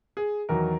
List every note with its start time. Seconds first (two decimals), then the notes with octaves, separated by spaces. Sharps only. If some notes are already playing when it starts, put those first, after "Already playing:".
0.17 G#4
0.49 E2 D#3 F#3 A#4